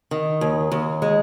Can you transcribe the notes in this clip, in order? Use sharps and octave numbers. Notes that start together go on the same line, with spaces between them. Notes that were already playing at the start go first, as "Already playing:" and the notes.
D#3
D#2
D#2
G#3